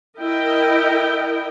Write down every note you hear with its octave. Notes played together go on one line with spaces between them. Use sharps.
E4 A#4 D#5 G5